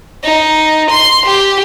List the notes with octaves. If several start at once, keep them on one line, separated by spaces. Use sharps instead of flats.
D#4
C6
G4